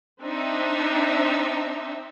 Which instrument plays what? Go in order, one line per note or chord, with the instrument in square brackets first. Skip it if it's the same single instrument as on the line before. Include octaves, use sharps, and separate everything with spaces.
[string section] C4 D4 D#4 E5